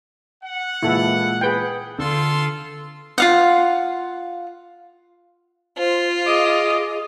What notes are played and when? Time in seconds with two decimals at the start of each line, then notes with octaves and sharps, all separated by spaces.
0.43 F#5
0.82 A#2 E3 G#3 E4 A4
1.41 G#4 B4 G5
1.98 D3 F4 A4 C6
3.18 F4 F5 F#5
5.78 F4 C5
6.26 G#4 D#5 D6